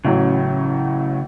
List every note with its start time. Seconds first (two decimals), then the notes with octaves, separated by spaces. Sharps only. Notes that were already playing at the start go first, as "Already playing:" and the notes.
0.05 A1 A2 C#3 F#3